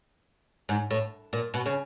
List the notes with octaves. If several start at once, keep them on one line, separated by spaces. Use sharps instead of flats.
G#2
A2
A#2
B2
C#3